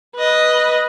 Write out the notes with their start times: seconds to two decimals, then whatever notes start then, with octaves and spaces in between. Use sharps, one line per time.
0.15 B4 D#5